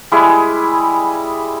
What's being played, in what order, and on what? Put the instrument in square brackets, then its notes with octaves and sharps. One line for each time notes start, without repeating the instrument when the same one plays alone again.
[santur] G3 G#3 E4 G#4